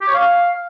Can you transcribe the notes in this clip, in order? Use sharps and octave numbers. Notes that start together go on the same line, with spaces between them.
G4
C#5
F5